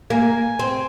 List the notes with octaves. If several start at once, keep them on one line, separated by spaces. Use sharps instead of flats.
A#3 G#5
C4